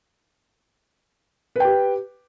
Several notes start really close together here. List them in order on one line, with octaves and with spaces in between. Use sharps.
B4 G5 G4